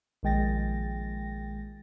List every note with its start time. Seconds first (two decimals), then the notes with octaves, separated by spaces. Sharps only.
0.23 A#1 D#3 G#3 G5 A6 A#6